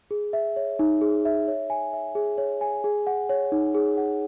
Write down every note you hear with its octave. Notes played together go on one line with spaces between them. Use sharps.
G#4
E5
C#5
D#4
G#4
E5
C#5
G#5
E5
G#4
C#5
G#5
G#4
F#5
C#5
D#4
G#4
F#5